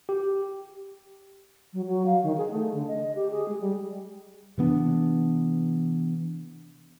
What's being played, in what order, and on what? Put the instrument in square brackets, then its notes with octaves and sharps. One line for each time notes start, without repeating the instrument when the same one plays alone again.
[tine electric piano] G4
[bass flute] F#3
F#3
F5
D#3
G#4
A3
D3
D#5
G4
G#4
G#3
G3
[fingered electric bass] C3 E3 B3 D4